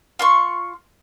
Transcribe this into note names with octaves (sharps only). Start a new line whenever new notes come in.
F4 C6 C#6